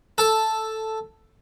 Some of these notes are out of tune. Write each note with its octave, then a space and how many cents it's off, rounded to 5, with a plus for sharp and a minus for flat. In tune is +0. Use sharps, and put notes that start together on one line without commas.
A4 +0